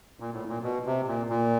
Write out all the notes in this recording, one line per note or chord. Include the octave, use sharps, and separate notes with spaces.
A#2
A2
A#2
B2
C3
A#2
A#2